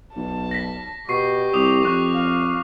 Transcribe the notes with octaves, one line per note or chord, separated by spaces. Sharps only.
B1 A5
A#6 B6
B2 G4 C#6 C7
C2 D6 D#6 F7
F2 C#6 F#6
F5